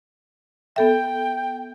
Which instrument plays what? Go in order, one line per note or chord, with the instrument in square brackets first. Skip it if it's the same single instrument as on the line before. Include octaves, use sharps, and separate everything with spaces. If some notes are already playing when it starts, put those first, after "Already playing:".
[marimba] B3 A4 E5 [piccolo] G5